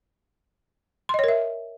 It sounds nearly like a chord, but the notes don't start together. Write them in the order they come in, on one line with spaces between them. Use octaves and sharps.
C6 D#5 C#5 A#4 E5